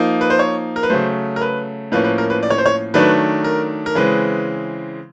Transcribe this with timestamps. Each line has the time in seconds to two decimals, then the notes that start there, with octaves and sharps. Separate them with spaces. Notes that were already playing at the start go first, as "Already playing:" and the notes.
Already playing: F3 A#3 D#4
0.21 B4
0.30 C5
0.39 C#5
0.76 A#4
0.83 B4
0.90 C#3 F#3 A3 C5
1.36 A#4
1.41 B4
1.92 A2 F3 A#3 C#4 B4
2.04 B4
2.18 A#4
2.30 B4
2.43 D5
2.50 C#5
2.58 C5
2.66 C#5
2.94 D#3 F#3 A3 D4 B4
3.44 A#4
3.86 A#4
3.95 C#3 E3 G#3 C4 B4